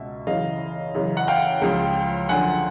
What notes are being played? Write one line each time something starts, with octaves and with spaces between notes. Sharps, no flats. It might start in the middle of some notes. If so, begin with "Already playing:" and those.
Already playing: C#2 B2 E5
F#2 C#3 E3 D#5 F5
F#2 C#3 E3
F#5
F5 G5
C#2 C#3 F3
F#2 D3 F3 F#5 G#5